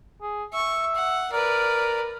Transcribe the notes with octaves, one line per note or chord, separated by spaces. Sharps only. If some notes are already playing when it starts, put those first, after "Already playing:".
G#4
E5 C#6
F#5
A#4 B4 D5